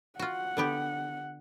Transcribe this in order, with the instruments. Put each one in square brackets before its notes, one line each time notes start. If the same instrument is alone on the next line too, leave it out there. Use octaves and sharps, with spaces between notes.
[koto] F4 F#4 [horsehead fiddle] F#5
[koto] D3 B3 G4